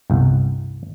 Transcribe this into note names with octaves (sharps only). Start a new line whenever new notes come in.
G1 C2